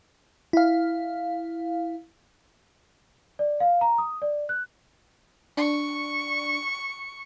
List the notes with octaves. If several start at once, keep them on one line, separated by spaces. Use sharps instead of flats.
E4 F5
D5
F5
A#5
D#6
D5
F#6
D4 C#6